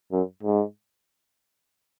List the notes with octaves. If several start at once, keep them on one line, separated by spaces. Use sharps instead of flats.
F#2
G#2